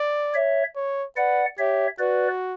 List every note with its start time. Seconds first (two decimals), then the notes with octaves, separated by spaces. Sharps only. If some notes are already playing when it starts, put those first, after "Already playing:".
Already playing: D5
0.34 C#5 E5
0.76 C#5
1.16 B4 D5 F#5
1.58 G4 C#5 E5
1.99 F#4 B4 D5